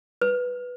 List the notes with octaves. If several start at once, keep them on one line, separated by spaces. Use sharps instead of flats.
B4